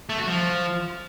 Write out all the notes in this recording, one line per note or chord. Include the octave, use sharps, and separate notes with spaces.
A3
F#4
F3